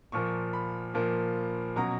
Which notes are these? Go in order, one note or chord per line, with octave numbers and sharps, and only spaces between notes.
A#2 F3 A#3 C#6
B5
A#2 F3 A#3
B2 F#3 C#4 A#5